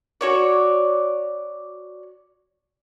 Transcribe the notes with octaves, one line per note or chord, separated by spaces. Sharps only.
F#4 C#5 D5